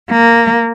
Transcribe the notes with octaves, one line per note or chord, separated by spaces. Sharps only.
A#3